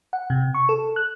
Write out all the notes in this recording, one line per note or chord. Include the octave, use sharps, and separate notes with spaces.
F#5
C3
C#6
A4
F#6